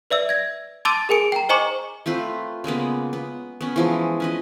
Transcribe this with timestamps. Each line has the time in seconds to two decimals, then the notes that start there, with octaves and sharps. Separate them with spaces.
0.10 B4 D5 E5 E6
0.29 G#6 A#6
0.85 A5 C6 D6 E6 A6 D#7
1.09 G#4 A#4 G#5 D7
1.32 G5 A#5
1.49 C5 D#5 G#5 A#5 C#6 D6
2.06 A3 C4 F4 B4
2.64 C#3 G#3 A#3 B3
3.13 B3
3.61 B3 C#4
3.76 E3 F3 G#3
4.20 C#4 B4 D#5